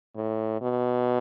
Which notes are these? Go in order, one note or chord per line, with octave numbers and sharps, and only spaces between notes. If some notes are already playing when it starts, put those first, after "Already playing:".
A2
B2